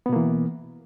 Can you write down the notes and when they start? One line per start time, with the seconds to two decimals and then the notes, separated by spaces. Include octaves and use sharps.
0.06 B3
0.09 B2
0.13 A#3
0.16 E3